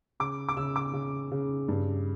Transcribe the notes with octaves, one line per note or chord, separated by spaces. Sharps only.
C#3 D6
D6
C#3 E6
D6
C#3
C#3
G2